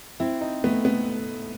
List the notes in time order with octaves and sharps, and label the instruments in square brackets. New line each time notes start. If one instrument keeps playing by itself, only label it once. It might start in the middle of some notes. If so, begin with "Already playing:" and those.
[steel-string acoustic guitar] C4 [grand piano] E4
[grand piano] D#4
[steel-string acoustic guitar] A3 [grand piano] B3
[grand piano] B3